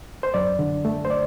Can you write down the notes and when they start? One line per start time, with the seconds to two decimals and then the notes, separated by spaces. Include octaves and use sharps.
0.23 C5
0.34 F#2 D5
0.59 D3
0.85 A3
1.05 C5
1.11 D5